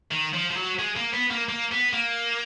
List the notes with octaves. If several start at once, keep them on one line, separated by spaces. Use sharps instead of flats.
D#3
F3
F3
F#3
G#3
A#3
B3
A#3
A#3
B3
A#3